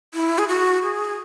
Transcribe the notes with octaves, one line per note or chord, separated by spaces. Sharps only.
E4
G#4
F#4
G#4